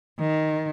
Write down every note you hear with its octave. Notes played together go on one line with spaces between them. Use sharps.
D#3